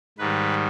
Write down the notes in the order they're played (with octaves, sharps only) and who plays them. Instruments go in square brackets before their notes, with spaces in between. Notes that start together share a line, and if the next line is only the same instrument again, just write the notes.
[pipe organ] G#2 D#3 G3 B4